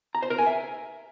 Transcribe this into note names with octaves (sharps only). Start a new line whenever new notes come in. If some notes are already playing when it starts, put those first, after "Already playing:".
A#5
C5
A#4
G#5
E5